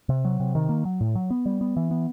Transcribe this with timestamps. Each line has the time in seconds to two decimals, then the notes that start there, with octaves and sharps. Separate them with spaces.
0.09 C3
0.25 F#3
0.40 C3
0.55 D#3
0.69 A#3
0.85 F#3
1.01 A2
1.15 F#3
1.30 B3
1.46 G3
1.61 B3
1.77 E3
1.91 B3